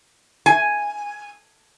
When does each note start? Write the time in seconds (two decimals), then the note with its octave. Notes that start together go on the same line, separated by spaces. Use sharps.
0.46 G#5